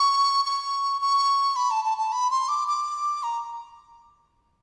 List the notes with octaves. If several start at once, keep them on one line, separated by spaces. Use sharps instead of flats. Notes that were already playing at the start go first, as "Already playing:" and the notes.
Already playing: C#6
C#6
C#6
B5
A5
A5
A5
B5
C6
D6
D6
A#5